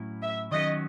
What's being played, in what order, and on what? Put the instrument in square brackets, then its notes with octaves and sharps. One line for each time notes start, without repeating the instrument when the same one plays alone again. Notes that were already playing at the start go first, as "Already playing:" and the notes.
Already playing: [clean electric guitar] A2 F#3 C#4 E4
[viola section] E5
[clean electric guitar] D#3 F#3 C#4 [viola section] D#5